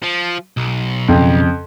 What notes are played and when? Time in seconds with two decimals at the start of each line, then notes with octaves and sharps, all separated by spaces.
0.02 F3
0.57 B1
1.08 F2 C#3